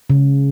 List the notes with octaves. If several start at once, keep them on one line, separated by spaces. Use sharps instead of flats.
C#3